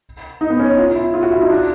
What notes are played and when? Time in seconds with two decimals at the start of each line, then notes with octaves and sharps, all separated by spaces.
0.41 D#4
0.50 B3
0.60 C#4
0.78 F4
0.95 E4
1.14 F4
1.23 F#4
1.32 E4
1.41 D#4
1.50 D4